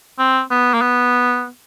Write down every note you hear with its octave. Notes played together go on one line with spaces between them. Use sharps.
C4
B3
A#3
B3